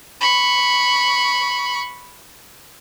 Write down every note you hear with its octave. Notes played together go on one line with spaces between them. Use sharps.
B5 C#6